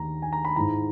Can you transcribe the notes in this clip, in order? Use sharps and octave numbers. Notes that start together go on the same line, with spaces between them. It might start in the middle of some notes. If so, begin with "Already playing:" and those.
Already playing: D#2 D#3 A#5
G#5
A#5
B5
G#2 E3 A#5